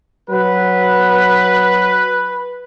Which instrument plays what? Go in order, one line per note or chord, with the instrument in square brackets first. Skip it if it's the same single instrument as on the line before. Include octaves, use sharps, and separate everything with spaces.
[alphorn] F#3 [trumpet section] B4